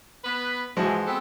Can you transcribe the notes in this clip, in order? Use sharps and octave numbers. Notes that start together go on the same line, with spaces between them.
B3 B4
G#2 E3 F3 G#3 F#4
B3 C4 A4